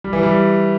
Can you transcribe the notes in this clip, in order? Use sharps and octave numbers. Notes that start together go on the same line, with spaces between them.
G3
E3
G3